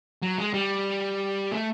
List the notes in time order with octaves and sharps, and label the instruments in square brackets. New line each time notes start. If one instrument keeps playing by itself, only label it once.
[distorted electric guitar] F#3
G#3
G3
A3